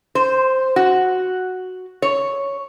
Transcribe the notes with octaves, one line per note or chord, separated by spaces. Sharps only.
C5
F#4
C#5